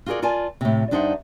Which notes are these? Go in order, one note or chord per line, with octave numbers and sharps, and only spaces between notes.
F4 F#4 G#4 A#4 D5
F4 A#4 D5 G#5 A5
A2 C3
G2 D4 D#4 C5 E5 F#5